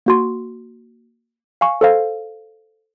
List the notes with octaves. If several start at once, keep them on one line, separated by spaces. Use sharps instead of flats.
A#3 F#4 C6
F5 G#5 C#6
A4 C5 F5